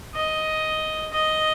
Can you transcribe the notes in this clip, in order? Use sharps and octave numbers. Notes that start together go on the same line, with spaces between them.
D#5
D#5